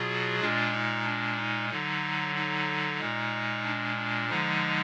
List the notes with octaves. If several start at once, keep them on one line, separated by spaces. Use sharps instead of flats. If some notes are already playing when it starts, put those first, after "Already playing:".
Already playing: B2 F#3 F4 G#4
A#2 G#3 D4 F4
D#4
D4
D#4
D3 F#3 D#4
D#4
A#2 G#3
D4
D4
D3 F3 G#3 D#4